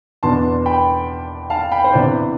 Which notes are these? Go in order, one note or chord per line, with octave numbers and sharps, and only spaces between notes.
E2 B2 B3 D4 A5 C6
G5 B5
F5 A5
G5 B5
C5
C3 E3 B3 D4 B4 D5